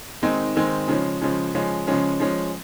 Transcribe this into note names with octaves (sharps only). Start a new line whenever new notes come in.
D#3 G#3 C4 D#4
D#3 G#3 C4 D#4
C#3 F3 G#3 C#4
C#3 F3 G#3 C#4
C#3 F3 G#3 C#4
C#3 F3 G#3 C#4
F3 G#3 C#4